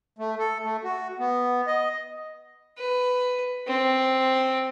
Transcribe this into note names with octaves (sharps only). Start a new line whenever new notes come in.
A3
A4
A3
F#4
B3
D#5
B4
C4